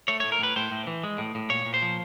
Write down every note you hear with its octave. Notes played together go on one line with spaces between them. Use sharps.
A3 C#5
A2 C#5
A#4
A2 B4
A2 C5
A2
E3
G#3
A2
A2
A#2 C#5
A#2
C5
F3